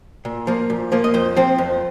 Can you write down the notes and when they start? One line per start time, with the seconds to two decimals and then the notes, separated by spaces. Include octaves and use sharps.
0.25 A#2
0.47 F3 A#3
0.70 A#2
0.92 F3 A#3
1.04 D#5
1.14 F2 C5
1.36 F3 C4
1.58 F2